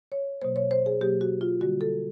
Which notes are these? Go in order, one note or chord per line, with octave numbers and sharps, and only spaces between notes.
C#5
B2 F#3 A#3 C5
C#5
C5
G#4
B2 F#3 A#3 G4
F#4
F4
D3 G3 A#3 F#4
A4